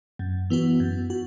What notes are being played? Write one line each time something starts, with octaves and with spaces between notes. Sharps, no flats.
F#2
E3 B3 F#4
F#2
F#4